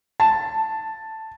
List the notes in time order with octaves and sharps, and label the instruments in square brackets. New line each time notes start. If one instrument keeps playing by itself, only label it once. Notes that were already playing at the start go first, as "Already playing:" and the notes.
[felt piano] A5